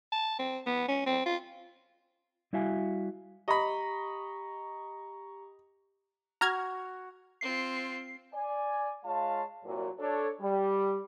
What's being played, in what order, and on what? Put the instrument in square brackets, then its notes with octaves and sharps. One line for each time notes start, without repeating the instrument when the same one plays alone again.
[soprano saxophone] A5
C4
B3
C#4
C4
F4
[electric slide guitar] G3 E4 F#4 E5 F5 G#5
[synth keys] G4 A#5 C#6 [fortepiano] D#5 B5
[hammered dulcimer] F#4 [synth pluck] A#5 F6 G#6
[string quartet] C4 F4 [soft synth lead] C7
[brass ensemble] D5 G#5
G#3 F4 C#5 F5 A5
C2 A#2 F#3
D4 A4 C#5
G3